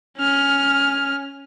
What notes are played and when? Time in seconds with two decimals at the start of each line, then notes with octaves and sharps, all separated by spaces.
0.18 C#4 F6